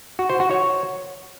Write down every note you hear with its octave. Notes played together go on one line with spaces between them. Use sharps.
F#4
C5
F#4
C#5